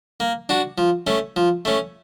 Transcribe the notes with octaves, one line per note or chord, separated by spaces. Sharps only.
A#3
D4 F#4
F3
A3 C#4
F3
A3 C#4